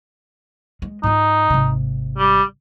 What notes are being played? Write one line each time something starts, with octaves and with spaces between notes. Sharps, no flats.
G#3
G#2 D#4 F4
G#1 C3
G3